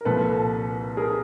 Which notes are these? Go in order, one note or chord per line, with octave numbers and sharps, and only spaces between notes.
A#4
C2 A#2 F3 A4 B4
G#4 A#4